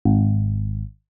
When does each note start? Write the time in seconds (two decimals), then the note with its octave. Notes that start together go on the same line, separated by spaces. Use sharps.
0.05 G#1